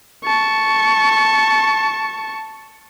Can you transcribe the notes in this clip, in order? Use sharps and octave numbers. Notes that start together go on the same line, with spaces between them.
A5 C#6